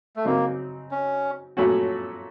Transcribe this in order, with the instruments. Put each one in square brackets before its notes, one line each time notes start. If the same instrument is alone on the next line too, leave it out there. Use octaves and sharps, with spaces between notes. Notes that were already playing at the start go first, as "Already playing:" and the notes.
[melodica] A3
[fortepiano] C#3 F#3 C4 D#4 [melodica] A#3
[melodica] C#4
[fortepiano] A#2 F#3 A3 C#4 F#4